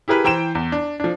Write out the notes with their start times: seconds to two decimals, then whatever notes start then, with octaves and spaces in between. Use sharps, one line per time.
0.08 E4 G4 G#4 A#4 B4
0.24 E3 C5 G5 A#5 E7
0.55 E2
0.72 D4
1.00 F3 D4